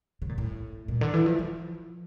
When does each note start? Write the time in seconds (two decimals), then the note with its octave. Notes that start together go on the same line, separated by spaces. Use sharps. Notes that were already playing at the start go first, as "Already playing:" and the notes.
0.22 C#3
0.29 A#2
0.38 A2
0.88 A#2
1.01 D3
1.14 E3
1.26 F3
1.39 F3